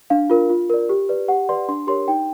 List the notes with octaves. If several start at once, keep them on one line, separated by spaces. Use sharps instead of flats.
D4 F5
F4 A#4
F4
A#4 D5
G4
B4 D5
G4 F#5
B4 D5 C6
D4 C6
G4 A#4 C#5 C6
D#4 G5